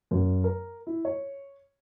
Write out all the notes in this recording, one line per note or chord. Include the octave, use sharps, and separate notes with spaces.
F#2
A#4
E4
C#5